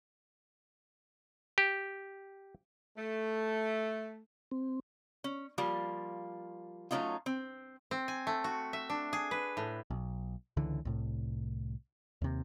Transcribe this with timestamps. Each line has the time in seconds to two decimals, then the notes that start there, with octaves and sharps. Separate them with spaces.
1.58 G4
2.97 A3
4.51 C4
5.24 C#4
5.58 F3 G3 A#3 F4
6.91 F#3 A3 A#3 C#4 D#4 F4
7.26 C4
7.91 C4
8.08 G#5
8.27 A3
8.44 F#4
8.73 E5
8.89 D4
9.13 G#4
9.31 B4
9.57 A2
9.90 B1
10.57 C#2 D3 E3
10.85 C2 A2
12.22 D#2 C3